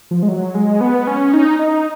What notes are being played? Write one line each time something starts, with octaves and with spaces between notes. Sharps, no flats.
F3
G#3
F#3
G#3
B3
C#4
D#4
D#4